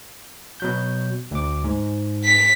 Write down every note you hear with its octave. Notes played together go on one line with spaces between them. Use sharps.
B2 F#3 G6
D2 D6
G#2
B6